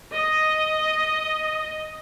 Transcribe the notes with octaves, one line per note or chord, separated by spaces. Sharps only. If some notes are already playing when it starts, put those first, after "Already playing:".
D#5